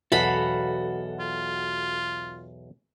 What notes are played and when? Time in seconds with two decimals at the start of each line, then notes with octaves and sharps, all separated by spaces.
0.12 B1 E2 F#4 A4 F5 F#5 A5 B5
1.20 F4